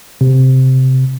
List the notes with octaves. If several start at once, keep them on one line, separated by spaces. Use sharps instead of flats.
C3